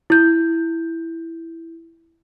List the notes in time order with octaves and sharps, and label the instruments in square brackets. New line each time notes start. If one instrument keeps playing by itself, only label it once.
[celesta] E4 G6